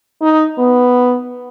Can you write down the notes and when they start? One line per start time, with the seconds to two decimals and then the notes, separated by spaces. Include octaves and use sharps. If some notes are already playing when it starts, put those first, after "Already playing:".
0.21 D#4
0.58 B3